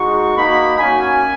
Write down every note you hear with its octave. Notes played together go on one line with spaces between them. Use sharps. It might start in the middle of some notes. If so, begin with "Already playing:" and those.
Already playing: G#3 D#4 F#4 C#6
A#3 D#4 F#4 B5
A#3 C#4 F#4 G#5